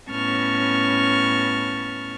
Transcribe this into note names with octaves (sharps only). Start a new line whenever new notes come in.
A2 B3 C#4 A5 C#6 F6